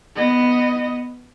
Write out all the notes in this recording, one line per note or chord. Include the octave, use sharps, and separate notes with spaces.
B3 D#5